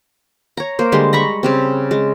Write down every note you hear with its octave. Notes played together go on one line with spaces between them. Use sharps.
C#5 A#5
A#3 C5
D3 G3 G#3 C6
A#5 B5 C#6
C#3 G3 C4
G#3